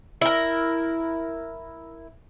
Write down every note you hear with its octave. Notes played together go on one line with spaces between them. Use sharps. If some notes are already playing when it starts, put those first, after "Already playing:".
E4 A#4